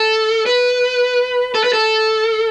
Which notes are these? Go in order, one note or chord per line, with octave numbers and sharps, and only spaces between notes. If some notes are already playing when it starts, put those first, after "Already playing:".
Already playing: A4
B4
A4
B4
A4